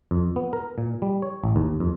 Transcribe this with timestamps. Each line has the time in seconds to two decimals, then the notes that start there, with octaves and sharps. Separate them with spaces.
0.11 F2
0.36 B3
0.53 A#4
0.78 A#2
1.02 G3
1.22 C#5
1.44 A1
1.56 D#2
1.80 F2